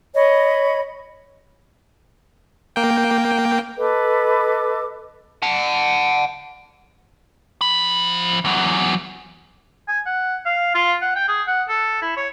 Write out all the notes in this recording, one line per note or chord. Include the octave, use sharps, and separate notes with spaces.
C#5 D#5 B5
A#3 G5
A4 B4 D#5 D6
F#5 A5
F3 B5
E2 F#3
G#5
F#5
F5
F4
F#5
G5
G#4
F#5
A4
E4
C#5